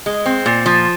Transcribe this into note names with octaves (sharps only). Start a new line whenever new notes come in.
G#3
C4
A#2
F3